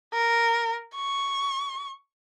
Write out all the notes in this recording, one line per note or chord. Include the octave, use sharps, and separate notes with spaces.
A#4
C#6